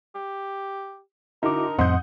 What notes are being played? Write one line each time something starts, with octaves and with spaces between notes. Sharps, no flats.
G4
D3 D#4 E4 F#4 A#4 D6
F2 A2 C4 D#5 F#5 C6 D#6 G6